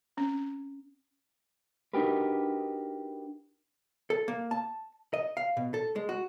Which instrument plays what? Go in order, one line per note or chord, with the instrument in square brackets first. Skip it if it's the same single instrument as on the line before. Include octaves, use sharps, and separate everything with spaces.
[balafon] C4 C#4
[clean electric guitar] D4 D#4 F#4 G4 A#4 B4
[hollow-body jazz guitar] A4
A#3
A5
D#5
F5
B2
A4
G#3
F#4